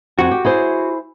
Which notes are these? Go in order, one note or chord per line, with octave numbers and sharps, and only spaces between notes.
F2 F#4
G4
E4 G#4 C5